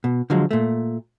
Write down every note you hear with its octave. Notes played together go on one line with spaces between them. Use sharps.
B2
D3 F3 F#3 G#3
A#2 A3